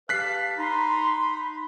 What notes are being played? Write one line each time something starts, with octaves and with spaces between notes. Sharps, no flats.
G4 B4 F5 A5 F#6 B6 C7
D#4 B5 C6